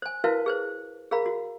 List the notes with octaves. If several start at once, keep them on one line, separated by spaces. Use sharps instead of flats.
C5 G#5
E4 F#4 A#4 B4 F5 A5
G#4 B4 C5
G#4 A#4 F5 A#5 B5
F#4